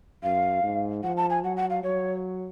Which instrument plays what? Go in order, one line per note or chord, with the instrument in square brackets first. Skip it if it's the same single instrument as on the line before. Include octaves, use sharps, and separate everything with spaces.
[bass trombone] F#2 [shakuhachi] F5
[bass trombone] G#2
[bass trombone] F3 [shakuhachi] F#5
[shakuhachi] A5
G#5
[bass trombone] F#3 [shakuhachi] F#5
[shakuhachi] F#5
F5
[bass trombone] F#3 [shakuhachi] C#5